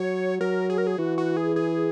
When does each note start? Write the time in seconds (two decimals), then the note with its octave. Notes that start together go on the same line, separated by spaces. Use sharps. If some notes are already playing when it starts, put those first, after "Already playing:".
Already playing: F#3 C#5
0.40 F#3 A#4
0.70 G#4
0.78 A#4
0.87 G#4
0.98 E3 F#4
1.18 F#4
1.37 G#4
1.56 G#4